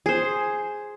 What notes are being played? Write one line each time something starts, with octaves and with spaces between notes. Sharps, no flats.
G#4 C5